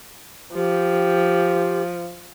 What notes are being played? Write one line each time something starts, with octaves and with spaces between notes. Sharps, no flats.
F3 G4